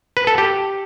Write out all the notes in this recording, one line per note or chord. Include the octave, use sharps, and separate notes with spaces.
B4
A4
G4